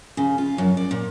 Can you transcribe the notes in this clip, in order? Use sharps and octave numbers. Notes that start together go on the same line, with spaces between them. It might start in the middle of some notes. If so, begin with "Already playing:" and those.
C#3
F4
F#2
D5
A#2